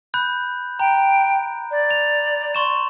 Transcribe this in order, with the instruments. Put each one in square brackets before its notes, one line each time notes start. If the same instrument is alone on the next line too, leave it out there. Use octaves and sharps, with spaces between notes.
[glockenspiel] B5 F#6 G6
[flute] G5 [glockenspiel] A#5
[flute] D5
[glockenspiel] F7
C6 C#6 E7